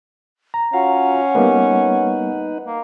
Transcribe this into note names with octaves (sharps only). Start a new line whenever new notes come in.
A#5
C#4 F4 F#4 F5 F#5
G3 A#3 B3 D#4 B4
A#3